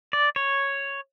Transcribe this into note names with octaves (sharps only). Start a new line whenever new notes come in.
D5
C#5